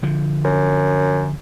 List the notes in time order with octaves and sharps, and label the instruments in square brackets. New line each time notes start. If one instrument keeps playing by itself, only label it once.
[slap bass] D3 F3
[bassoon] F#2